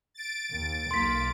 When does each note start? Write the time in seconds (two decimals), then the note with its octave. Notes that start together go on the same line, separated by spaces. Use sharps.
0.14 A6 D7
0.51 D#2
0.91 B1 A#3 C6 B6